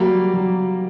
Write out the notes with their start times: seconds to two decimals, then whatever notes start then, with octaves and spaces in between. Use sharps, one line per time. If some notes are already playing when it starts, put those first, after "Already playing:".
Already playing: F#3 G3 A#3
0.33 F#3